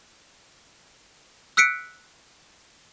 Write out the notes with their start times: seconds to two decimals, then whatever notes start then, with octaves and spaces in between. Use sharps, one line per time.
1.57 E6 F#6 B6 C#7 D7